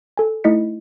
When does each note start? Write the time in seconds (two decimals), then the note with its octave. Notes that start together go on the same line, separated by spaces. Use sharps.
0.18 A4 G#5
0.44 A3 D#4 E4 D#5 B6 C#7